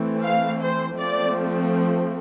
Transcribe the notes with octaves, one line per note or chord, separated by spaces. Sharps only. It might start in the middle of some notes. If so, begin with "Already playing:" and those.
Already playing: E3 A3 C4
F5
C5
F3 A3 C4 D5